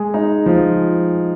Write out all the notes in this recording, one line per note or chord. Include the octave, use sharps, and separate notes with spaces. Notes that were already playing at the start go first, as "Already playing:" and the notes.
Already playing: G#3 G#4
D#4
F3